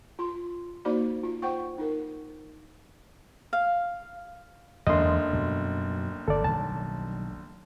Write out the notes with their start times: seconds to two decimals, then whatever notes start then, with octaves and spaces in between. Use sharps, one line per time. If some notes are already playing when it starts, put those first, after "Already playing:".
0.19 F4 C6
0.85 A#3 D#4 F#4 C5 D5 B5
1.23 F4
1.42 C5 F#5 G5 C#6
1.78 D#4 A#4
3.53 F5
4.87 F#1 E2 D3 G#3 D#5 C6
5.33 F#2 B2 G3
6.28 G1 A4 D5
6.44 B1 D#3 G3 A5